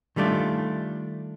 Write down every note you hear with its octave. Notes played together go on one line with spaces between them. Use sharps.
D#3 G3 A3 D4 F4